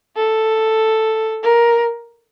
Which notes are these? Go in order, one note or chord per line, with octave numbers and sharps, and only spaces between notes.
A4
A#4